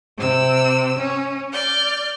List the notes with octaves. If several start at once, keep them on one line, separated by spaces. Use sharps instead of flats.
C3 E6
C#4
D5 F6 G6